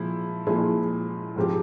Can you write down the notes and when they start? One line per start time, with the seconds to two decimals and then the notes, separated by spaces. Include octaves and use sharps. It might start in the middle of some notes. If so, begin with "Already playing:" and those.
Already playing: A#2 F3 G#3 E4
0.47 A#2 F3 G#3 E4
1.36 G#2 F3 G#3 C4 G4